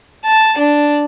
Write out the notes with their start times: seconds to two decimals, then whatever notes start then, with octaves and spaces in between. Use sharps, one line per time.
0.24 A5
0.58 D4